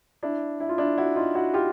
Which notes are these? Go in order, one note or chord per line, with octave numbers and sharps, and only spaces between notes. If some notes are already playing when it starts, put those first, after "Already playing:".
D4 E4
E4
F4
D4 E4
E4 F#4
D#4 F4
E4 F#4
F4 G4